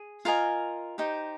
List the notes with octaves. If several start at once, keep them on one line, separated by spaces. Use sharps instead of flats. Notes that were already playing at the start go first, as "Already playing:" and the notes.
Already playing: G#4
F4 A#4 D#5 G#5
D#4 G4 C5